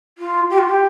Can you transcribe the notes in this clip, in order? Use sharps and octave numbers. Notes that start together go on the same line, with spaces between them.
F4
G4
F4
G4